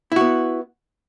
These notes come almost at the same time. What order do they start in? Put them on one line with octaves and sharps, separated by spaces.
E4 F#4 B3